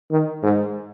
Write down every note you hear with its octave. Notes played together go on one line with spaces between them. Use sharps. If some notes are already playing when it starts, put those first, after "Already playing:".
D#3
G#2